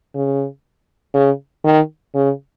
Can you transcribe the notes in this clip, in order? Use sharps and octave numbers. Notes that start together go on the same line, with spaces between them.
C#3
C#3
D#3
C#3